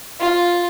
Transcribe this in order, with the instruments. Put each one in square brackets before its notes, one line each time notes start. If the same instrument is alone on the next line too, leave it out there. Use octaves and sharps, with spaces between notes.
[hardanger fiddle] F4